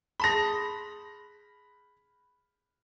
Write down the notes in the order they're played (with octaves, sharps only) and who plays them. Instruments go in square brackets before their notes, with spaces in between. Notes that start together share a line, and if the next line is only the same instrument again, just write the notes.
[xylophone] G#4 A5 C6 [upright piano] B5 A#6